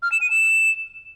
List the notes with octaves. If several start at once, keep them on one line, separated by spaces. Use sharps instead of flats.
F6
E7
D#7
E7